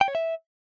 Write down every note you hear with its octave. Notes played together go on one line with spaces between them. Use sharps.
G5
C#5
E5